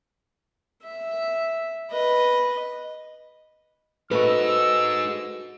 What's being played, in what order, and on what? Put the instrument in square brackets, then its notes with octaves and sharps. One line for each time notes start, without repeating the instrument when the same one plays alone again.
[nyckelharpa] E5
B4 D#5
[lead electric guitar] G#3 D#4 [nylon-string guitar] F#4 A4 B4 [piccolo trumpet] E6